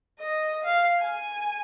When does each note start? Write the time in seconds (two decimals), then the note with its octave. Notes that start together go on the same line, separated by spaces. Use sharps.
0.20 D#5
0.64 F5
0.99 G#5